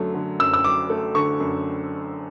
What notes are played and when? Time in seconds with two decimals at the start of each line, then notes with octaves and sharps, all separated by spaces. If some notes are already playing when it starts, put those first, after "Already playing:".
Already playing: F#2 D3 F#3 A3
0.14 D3
0.39 F#2 E6
0.53 E6
0.64 F#3 D6
0.90 A3
1.15 D3 C#6
1.40 F#2